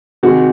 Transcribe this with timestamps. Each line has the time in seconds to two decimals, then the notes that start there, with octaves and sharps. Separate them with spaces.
0.23 C3 D#3 G#3 F#4